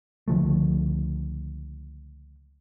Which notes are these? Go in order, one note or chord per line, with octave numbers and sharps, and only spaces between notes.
C#2 D3 F3 A3